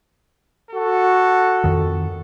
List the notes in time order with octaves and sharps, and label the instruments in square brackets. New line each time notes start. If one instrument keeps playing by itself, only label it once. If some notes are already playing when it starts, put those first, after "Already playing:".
[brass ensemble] F#4 A4
[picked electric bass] F2 D#3